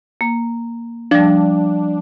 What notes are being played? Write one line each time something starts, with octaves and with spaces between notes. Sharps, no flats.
A#3
F3 G3 D4